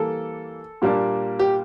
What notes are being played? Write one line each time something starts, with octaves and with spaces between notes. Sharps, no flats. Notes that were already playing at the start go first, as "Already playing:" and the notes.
Already playing: E3 G3 A#3 A4
A#2 G3 A#3 D4
G4